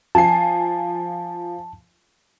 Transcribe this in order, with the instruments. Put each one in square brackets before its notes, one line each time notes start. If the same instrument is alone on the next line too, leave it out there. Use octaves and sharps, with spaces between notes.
[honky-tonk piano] F3 G#5 C7 [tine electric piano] A5